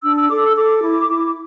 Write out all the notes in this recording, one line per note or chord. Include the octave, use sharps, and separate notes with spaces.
D4 E6
E6
A4 D6
E6
A4 D6
E4
E4